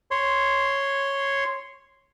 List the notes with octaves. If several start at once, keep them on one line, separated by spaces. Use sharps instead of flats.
C#5 C6